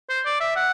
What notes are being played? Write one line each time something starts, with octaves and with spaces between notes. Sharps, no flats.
C5
D5
E5
F#5